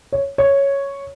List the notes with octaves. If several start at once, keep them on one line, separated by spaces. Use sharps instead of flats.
C#5
C#5